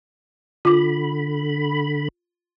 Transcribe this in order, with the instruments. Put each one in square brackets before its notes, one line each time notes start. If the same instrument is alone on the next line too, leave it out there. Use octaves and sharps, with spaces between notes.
[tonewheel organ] D3 B5 [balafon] F4 D6